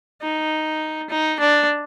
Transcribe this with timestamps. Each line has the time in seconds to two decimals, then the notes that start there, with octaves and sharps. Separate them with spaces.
0.22 D#4
1.10 D#4
1.39 D4